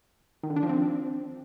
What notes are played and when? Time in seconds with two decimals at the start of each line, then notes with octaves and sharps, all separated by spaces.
0.43 D#3
0.50 D3
0.56 D4
0.63 F3
0.69 C4